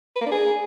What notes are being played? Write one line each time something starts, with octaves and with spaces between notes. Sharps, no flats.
B4
A#3
D4
G#4